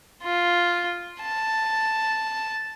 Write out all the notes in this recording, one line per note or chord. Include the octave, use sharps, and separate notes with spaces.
F4
A5